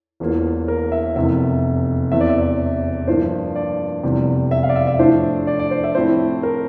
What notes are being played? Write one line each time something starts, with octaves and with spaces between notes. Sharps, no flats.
E1 E2 E3 A#3 F4
A#4
E5
F1 E2 C3 E5
E1 E2 C3 E3 E5
D5
E5
G2 F3 A#3 C5
D5
F1 E2 C3 G3
E5
F5
D5
E5
E5
A2 F3 A3 D4 C5
D5
D5
C5
E5
A2 F3 A3 C4 E4 C5
A#4